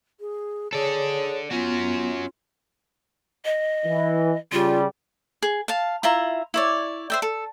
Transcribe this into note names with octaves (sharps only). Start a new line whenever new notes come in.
G#4
G#4 A4 C#5 D5
B3 C#4 F4 F#4
D#5
E3
C#3 G3 F4
G#4
F5 A5
E4 F4 E5 A#5
E4 C#5 D5
C5 E5 G5
A4